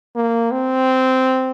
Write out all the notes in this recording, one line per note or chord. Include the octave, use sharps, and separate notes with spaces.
A#3
C4